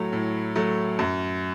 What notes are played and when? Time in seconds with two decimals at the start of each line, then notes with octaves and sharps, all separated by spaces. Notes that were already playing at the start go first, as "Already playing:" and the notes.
Already playing: A2 F#3 A3 E4
0.12 A2
0.56 F#3 A3
0.99 F#2